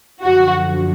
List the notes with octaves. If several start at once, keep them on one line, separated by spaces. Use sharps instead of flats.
F#2 D3 F3 F#4